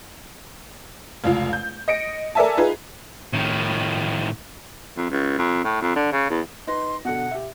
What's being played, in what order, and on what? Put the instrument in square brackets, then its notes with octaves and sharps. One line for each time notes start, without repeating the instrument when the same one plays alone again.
[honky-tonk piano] F1 C#2 F4
G6
D#5 A#6 C#7 D7
A4 A#4 D5 E5 G#5 A5
D#4 F4 G#4 B4
[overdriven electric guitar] A2 D#3
[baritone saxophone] F2
C#2
F2
A2
F2
D3
C#3
E2
[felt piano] D#4 B4 A#6 [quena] C6
[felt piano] B2 D3 [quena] F#5
[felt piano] G4 E5